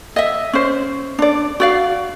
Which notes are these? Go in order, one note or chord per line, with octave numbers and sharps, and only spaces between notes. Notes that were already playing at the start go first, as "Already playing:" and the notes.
D#5 E5
C#4 C5
D4 D5
F#4 D5 F5